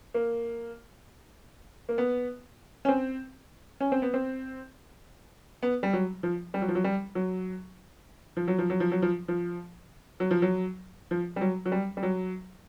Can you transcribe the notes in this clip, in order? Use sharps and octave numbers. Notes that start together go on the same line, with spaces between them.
A#3
A#3
B3
C#4
C4
C#4
C4
B3
C4
B3
G3
F#3
F3
G3
F#3
F3
F#3
G3
F#3
F3
F#3
F3
F#3
F3
F#3
F3
F3
F#3
F3
F#3
F3
G3
F#3
F#3
G3
G3
F#3